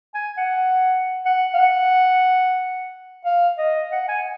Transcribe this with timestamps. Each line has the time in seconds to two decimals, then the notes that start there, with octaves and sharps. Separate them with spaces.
0.15 G#5
0.38 F#5
1.26 F#5
1.54 F5
1.59 F#5
3.25 F5
3.58 D#5
3.92 F#5
4.08 G#5